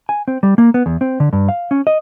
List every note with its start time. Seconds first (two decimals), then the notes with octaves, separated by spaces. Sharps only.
0.09 G#5
0.28 C4
0.43 G3
0.58 A#3
0.74 B3
0.86 E2
1.01 C4
1.20 D3
1.33 G2
1.49 F5
1.71 C#4
1.87 D#5